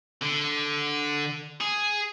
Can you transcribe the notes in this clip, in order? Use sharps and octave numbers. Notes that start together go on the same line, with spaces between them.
D3
G#4